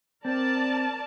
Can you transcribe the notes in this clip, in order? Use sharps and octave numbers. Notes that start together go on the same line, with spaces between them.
C4 A#4 D5 A5